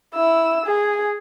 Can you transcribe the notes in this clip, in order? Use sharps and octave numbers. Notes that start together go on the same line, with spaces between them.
E4 E6
G#4